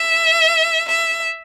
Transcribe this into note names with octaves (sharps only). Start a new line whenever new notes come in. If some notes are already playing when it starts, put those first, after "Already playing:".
Already playing: E5
E5